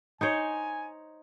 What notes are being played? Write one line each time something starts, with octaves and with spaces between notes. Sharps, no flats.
D#4 C5 C#5 G#5